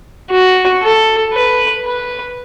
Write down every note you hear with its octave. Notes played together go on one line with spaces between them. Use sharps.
F#4
A4
B4
B4